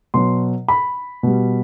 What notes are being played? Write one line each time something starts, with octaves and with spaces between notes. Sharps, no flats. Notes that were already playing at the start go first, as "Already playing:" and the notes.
B2 F#3 C6
B5
B2 G3